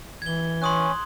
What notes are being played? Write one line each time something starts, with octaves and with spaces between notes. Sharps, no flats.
E3 G#6 G7
C#4 C6 D#6 F#6